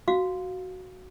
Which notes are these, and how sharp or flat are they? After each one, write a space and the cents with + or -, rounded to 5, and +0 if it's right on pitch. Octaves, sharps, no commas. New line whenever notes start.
F#4 +0 F5 +10